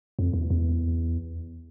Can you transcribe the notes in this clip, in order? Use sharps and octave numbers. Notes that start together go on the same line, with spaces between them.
F2
E2
E2